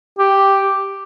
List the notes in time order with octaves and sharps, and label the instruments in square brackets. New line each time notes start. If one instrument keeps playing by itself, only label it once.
[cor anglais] G4